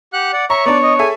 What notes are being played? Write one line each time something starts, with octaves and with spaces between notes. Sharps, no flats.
G4 F#5 F#6
D5 F#5
C#5 E5 A#5 C#6
B3 D4 D5
D#5
G#4 A4 E5 G#5